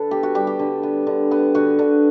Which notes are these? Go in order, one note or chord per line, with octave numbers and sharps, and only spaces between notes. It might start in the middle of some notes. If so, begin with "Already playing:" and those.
Already playing: D3 A4 B4
B3 G4
F#4
G3 G4
G4
D3
B3
D3
B3
D3 F#4
D3